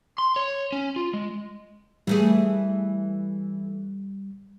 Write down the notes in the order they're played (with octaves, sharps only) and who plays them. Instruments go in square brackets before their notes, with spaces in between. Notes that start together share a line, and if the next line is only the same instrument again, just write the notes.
[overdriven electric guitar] C6
C#5
C#4
F4
G#3
[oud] E3 A3 G#4 [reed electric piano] G3